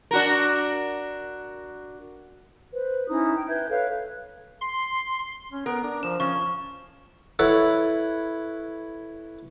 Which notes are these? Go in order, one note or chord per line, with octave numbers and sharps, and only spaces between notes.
D4 F#4 A#4
B4 C5
C#4 D#4 E4 D#6
G5
B4 E5 G6 G#6
A4 B4 C#5 F5
C6
C#4
B3 A#4
D4
F3 E7
F3 C#4 C#6
E4 A4 B4 C#5 F#5